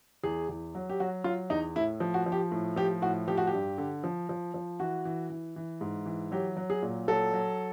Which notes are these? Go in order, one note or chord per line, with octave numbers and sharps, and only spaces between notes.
E2 G#4
E2
F#3
G4
F#3 F#4
F#3 F4
E2 D#4
A2 E4
F3
F#4
F3
G4
A2
F3 G4
A2 F#4
F3 G4
F#4
G4
G2
D3
F3
F3
F3
E3 F#4
E3
E3
E3
G#2
E3
F#3 G4
F#3
G#4
A#2
F#3 A4
F#3